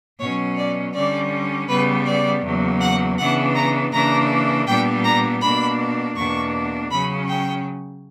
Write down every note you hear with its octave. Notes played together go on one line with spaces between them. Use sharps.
B2 F#3 C#4 C#5
D5
D3 G3 C#4 D5
C#3 G3 B3 B4
D5
E2 C#3 F#3 A#3
F#5
C#3 E3 B3 D4 F#5
A#5
C#3 E3 A#3 D4 A#5
A#2 G3 B3 D4 G5
A#5
B2 A#3 D4 B5
E2 B2 A#3 D4 C#6
C#3 F#3 C#4 B5
G5